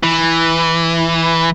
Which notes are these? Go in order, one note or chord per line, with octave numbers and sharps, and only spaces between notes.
E3